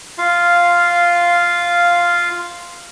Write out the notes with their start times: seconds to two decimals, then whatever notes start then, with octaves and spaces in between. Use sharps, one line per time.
0.18 F4 F5